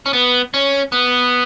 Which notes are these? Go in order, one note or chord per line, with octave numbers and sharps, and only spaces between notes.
C#4
B3
C#4
B3